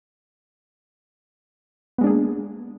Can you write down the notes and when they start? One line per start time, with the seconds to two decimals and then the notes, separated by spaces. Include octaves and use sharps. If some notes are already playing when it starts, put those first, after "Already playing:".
1.98 B3
2.01 G#3
2.04 D4
2.07 G#4
2.09 A#3